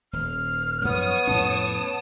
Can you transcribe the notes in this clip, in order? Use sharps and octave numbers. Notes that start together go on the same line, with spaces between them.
D#1 F6
F#2 F3 B3 C#5 D#6
F2 A2 C#4 A5